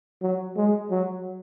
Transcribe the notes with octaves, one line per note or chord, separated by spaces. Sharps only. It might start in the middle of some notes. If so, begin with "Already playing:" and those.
F#3
G#3
F#3